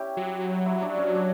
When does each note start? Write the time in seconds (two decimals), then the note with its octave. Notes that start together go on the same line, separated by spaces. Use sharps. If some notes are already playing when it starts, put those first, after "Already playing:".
Already playing: C#4 E4 G4
0.17 F#3
0.66 E4
0.82 D4
0.98 C#4
1.15 D4